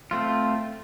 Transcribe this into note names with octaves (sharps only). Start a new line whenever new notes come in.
A3 C4 F4